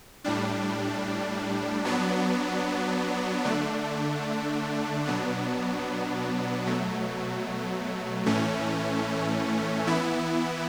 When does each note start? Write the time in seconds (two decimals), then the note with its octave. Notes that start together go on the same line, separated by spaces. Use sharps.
0.24 A2 G3 D4
1.85 F#3 B3 D4
3.44 D3 A3 D4
5.05 B2 F#3 B3 D4
6.66 B2 F#3 A3
8.26 A2 E3 A3 C#4
9.87 E3 B3 E4